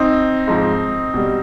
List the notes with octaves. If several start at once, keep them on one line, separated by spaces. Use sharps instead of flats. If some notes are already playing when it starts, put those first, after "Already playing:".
Already playing: C4 D#4
G#2 F3
B2 G3